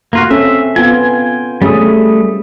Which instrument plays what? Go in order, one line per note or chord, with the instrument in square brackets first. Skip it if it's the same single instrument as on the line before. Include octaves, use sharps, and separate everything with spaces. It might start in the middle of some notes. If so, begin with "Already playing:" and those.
[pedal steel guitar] A#3 F4 F#4
[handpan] C4 C#4 A4 [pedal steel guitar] E5
[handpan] B3 F4 [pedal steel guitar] G5 G#5
[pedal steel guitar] G3 A3 D#6 [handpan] C#4 G#4